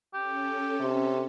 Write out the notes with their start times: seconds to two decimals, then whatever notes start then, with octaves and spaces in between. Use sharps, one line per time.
0.14 C#4 G4 A4
0.80 C3